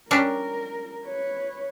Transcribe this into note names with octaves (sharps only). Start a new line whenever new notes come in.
G3 C#4 D4 A#4
B4 C#5